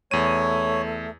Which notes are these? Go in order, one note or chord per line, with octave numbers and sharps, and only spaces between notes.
E2 A3 C#5 D#7